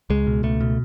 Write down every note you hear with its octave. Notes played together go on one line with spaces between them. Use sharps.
C#2 G#3
B2
C#2 A3
B2